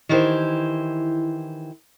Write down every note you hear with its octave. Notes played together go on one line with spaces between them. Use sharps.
D#3 E3 E4 G4 C5